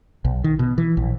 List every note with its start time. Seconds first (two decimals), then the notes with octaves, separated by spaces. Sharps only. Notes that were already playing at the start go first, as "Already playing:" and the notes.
0.25 B1
0.44 D#3
0.59 B2
0.78 E3
0.97 A#1